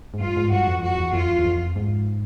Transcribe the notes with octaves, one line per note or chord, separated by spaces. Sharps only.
G#2
G2 F4
G#2
G2 F#4
F2
F2 F#4
E2
F2 F4
E2
F2
G#2